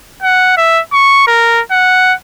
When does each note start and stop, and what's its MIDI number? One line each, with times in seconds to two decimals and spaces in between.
0.22 0.56 78
0.57 0.81 76
0.92 1.24 85
1.27 1.61 70
1.71 2.14 78